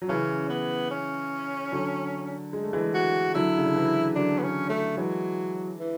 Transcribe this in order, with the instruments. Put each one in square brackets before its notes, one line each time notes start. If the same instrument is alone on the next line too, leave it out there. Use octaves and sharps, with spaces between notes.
[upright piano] F#3
[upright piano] C#3 E3 [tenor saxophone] C#4
[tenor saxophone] B3
C#4
[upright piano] D3 F#3
G#3
A3
E3 G#3
[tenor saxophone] F#4
[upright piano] D3 F#3 [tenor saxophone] E4
[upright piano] C#3
D3
C#3 E3
[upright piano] D3 F#3 [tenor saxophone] D4
[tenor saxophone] B3
C#4
A3
[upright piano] E3 G#3 [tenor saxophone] F#3
[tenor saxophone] E3